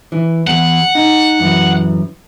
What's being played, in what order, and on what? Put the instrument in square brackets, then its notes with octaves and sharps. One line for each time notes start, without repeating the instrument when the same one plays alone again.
[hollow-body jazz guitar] E3
[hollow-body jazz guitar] E2 [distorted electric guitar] F#5
[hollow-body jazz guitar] D#4
F#2 E3